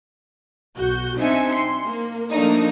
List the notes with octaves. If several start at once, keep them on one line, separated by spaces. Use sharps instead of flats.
B1 F#4 G6
C4 D4 D#4 E5 G#5 C#7
C6
A#3
F3 A3 A#3 D4 D#4